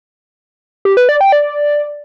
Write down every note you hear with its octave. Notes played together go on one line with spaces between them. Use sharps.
G4
B4
D5
G5
D5